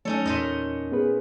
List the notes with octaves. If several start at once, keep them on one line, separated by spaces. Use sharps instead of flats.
F#3 A3 C#4 D#4 A4 C#5
E2 A#2 D#4 D#5
B3 G#4 B4